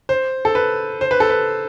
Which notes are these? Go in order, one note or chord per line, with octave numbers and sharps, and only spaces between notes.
C5
A4
B4
C5
B4
A4
B4